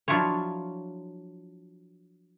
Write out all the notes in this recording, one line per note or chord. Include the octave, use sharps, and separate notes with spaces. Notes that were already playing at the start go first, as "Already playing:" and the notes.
F3 F#3 D4 E4 F4 C#5